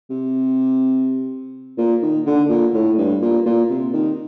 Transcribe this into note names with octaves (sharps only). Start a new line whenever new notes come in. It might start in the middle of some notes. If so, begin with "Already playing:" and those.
C3
A#2
D#3
D3
A#2
A2
G2
A#2
A#2
C3
D#3